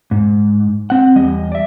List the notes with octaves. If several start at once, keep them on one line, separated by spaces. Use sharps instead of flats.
G#2
C4 F#5
E2 G3 D#5
D5 E5